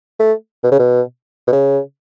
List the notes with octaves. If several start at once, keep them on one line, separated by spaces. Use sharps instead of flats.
A3
B2
C#3
B2
B2
C#3